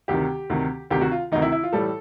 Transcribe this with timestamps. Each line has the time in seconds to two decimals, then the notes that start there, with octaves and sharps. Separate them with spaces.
0.08 D2 C3 D#3 G4
0.50 D2 C3 D#3
0.91 D2 C3 D#3 G4
1.02 F#4
1.11 F4
1.32 D2 C3 D#3 D#4
1.42 E4
1.52 E4
1.63 F4
1.73 A2 E3 G3 A4